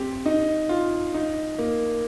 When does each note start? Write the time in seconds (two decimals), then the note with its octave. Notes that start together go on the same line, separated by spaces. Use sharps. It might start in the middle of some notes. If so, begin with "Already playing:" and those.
Already playing: C4 G4
0.26 D#4
0.69 F4
1.14 D#4
1.58 A#3